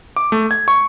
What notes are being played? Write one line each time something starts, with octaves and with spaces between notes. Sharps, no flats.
D6
A3
G#6
C#6